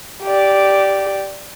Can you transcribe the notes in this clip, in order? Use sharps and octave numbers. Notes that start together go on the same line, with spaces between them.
G4 D5